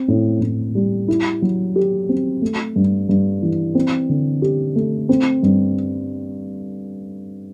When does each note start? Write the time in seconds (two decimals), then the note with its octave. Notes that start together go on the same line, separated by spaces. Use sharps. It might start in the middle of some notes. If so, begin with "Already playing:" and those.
Already playing: C4
0.08 A2
0.41 A2
0.75 G3
1.08 E4
1.42 F#3
1.76 G4
2.09 C4
2.42 A3
2.76 G2
3.09 G2
3.43 E3
3.75 C4
4.09 D3
4.42 G4
4.76 A3
5.09 C4
5.43 G2